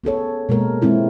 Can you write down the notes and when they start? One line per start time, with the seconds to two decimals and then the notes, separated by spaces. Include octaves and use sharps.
0.04 B3 G#4 A4 C#5
0.49 B2 G#3 A#3 A#4
0.82 G#3 C4 E4 F4